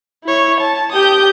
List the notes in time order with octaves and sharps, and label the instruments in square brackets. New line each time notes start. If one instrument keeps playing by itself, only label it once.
[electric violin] E4 C#5
A5
[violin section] G4 G6 [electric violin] D#6